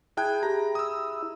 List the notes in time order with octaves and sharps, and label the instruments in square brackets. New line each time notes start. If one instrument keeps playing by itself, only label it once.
[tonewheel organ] E4 [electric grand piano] G#4 G5 [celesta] A5 F#6 G#6
[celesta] G4 G#4 [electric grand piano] A#5
[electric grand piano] D#6 E6